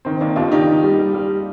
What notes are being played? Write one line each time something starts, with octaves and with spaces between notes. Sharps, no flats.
D#3 C4
D#3 A#3 D4
D#2 D4 F4
D#3 D#4 G4
D#3
G3
G3
G3